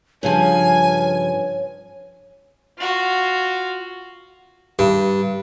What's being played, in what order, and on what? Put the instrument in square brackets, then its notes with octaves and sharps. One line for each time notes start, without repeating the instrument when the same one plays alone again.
[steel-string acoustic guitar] G2 C#3 F3 [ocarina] C#5 [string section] G#5
[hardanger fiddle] F4 F#4
[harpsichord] G2